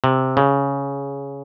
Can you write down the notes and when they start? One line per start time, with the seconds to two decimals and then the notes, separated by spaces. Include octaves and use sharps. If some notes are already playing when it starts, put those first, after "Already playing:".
0.04 C3
0.37 C#3